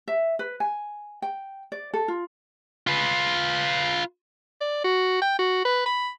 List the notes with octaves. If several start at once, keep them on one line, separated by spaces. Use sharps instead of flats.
E5
B4
G#5
G5
D5
A4
F4
F4 B4
D5
F#4
G5
F#4
B4
B5